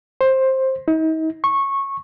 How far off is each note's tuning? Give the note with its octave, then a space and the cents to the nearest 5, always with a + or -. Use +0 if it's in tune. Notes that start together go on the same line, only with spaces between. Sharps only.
C5 +15
D#4 +40
C#6 -15